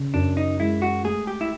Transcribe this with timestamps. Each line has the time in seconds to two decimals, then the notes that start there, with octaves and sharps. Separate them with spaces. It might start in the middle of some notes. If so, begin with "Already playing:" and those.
Already playing: C#3
0.14 F#2 D4
0.37 D#4
0.60 G#3 E4
0.82 F#4
1.04 A3 G#4
1.27 G4
1.41 E4